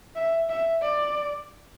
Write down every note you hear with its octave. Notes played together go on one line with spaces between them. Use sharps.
E5
E5
D5